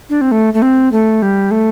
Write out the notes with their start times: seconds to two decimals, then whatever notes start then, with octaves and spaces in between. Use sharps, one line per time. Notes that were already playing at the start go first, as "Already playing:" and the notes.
0.10 D4
0.21 C4
0.32 A3
0.54 A3
0.62 C4
0.92 A3
1.22 G3
1.51 A3